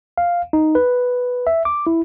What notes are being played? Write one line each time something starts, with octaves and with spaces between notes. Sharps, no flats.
F5
D#4
B4
E5
D6
E4